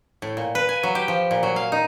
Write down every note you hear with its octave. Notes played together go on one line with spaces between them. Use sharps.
A2
A#2
B4
G#5
F#3
G4
F3
A#2
F#3
F5
D#4